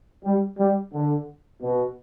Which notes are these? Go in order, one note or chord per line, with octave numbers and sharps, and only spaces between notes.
G3
G3
D3
B2